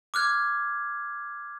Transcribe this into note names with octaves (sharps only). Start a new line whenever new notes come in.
D6 F6 F#6 G#6